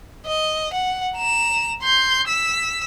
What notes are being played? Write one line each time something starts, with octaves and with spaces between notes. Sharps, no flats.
D#5
F#5
A#5 E7
C6 G6
E6 B6